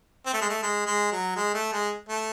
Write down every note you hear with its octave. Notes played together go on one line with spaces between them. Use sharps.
C4
A3
G#3
A3
G#3
G#3
F#3
G#3
A3
G#3
A3